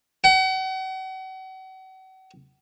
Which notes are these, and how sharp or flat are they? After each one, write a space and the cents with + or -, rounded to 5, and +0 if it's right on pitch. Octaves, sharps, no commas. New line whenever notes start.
F#5 +40